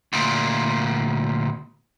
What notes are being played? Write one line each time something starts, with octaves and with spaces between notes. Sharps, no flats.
D2 A#2